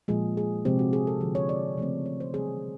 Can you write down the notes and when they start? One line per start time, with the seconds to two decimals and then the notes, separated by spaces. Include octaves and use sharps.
0.08 A#2 F3 G#3 G#4
0.37 G#4
0.65 C3 F3 G#3 C4 G4
0.79 F#4
0.93 G#4
1.07 A4
1.21 D3 F3 G#3
1.35 C#5
1.49 D5
1.77 C#3 F3 A3 C4
2.06 C#5
2.20 C5
2.34 C3 E3 G3 C4 G#4